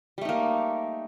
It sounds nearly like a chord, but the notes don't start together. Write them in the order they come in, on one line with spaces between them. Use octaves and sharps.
G3 A3 D#4 A#3